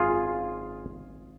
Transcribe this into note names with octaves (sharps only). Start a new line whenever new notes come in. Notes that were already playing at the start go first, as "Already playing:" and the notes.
Already playing: G#1 F#2 F4 G#4